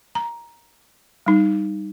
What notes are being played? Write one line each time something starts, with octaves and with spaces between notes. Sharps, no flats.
A#5
G3 D#4